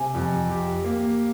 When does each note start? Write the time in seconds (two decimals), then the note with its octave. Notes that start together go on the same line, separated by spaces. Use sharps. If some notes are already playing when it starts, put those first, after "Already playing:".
Already playing: C3 G#5
0.15 F2
0.50 G4
0.84 A#3